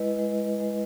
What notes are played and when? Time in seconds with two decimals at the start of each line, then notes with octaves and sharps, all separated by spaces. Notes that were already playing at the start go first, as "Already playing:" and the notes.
Already playing: G#3 E4 B4 D#5
0.19 G#3
0.60 G#3